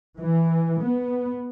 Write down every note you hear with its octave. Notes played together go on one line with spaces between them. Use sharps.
E3
B3